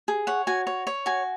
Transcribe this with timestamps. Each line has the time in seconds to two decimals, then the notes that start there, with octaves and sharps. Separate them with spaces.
0.08 G#4
0.27 C#5 F#5
0.47 F#4 G#5
0.67 C#5
0.87 C#5
1.06 F#4 G#5